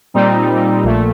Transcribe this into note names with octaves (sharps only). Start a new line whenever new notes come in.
A#2 G3 C4 D#4
A#1 A#2 A3